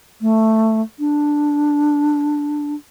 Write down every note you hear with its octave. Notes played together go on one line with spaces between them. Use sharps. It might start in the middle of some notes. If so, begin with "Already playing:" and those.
A3
D4